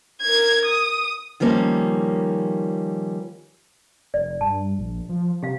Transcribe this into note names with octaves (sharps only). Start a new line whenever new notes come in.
A#4 G#6
D#6
D#3 F3 G3 A#3 C#4
F1 D5
G2 A5
A#1
F3
C3 G4 F5